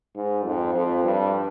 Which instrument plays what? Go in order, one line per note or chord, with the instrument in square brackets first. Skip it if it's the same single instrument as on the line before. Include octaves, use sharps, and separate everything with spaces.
[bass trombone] G#2
F2
F2
G2